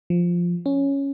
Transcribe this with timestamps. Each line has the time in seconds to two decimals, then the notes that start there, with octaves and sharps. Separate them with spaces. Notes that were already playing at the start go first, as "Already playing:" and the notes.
0.10 F3
0.66 C#4